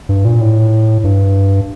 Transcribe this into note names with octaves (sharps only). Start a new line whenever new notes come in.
G2
A#2
A2
G2